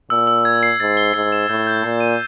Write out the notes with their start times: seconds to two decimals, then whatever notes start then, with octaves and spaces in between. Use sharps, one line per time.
0.10 A#2 E6
0.27 E6
0.45 G#6
0.63 C7
0.80 G#2 A6
0.97 G7
1.14 G#2 C7
1.32 E7
1.49 A2 G6
1.67 G6
1.84 A#2 C7
2.00 D#7